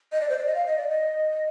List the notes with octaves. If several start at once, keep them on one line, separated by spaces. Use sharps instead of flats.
D#5
D5
C5
D5
D#5
F5
D#5
D5
D#5